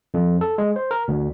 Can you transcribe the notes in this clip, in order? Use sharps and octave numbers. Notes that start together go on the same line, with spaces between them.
F2
A4
G#3
C5
A#4
D2